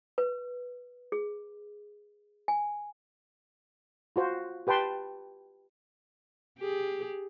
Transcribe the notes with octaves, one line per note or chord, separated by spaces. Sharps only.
B4
G#4
G#5
F4 F#4 C5
G4 B4 G5 A5 C6
G4 G#4